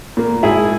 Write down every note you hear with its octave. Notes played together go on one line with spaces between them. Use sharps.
A#2 A#3
G#1 E4 G#4